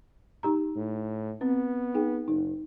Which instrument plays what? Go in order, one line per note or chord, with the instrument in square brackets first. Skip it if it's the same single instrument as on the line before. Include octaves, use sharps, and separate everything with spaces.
[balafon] D#4 G4 A#5
[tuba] A2
[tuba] B3 [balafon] C4
[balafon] D#4 G#4 G5
[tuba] F#1 [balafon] D#4